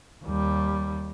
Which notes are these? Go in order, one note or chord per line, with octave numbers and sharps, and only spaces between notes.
D#2 G3